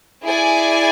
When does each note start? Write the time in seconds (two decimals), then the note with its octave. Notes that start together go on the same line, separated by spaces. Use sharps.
0.25 E4 G#4 D5 G#5